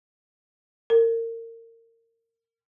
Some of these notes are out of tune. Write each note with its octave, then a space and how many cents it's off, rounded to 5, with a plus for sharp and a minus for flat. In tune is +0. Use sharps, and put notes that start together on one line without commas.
A#4 -30